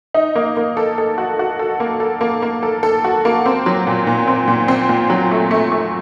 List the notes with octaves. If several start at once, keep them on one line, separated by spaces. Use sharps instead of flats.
D#4
A#3
A#3
A4
A4
F#4
F#4
A4
A#3
A4
A#3
A#3
A4
A4
F#4
A#3
C4
F#3
A#2
A#2
C4
A#2
C4
A#2
F#3
A3
A3
A3